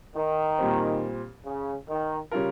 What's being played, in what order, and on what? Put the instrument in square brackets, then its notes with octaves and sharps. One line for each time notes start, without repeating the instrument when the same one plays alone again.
[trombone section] D#3
[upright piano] A#2 G3 C4
[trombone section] C#3
D#3
[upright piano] C#3 G3 C#4 F4 A#4